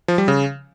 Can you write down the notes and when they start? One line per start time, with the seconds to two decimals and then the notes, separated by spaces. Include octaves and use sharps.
0.08 F3
0.18 G3
0.28 C#3